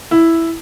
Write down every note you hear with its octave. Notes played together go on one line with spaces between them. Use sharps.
E4